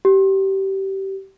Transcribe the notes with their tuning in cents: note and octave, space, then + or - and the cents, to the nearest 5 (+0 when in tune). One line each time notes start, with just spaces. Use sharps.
G4 -25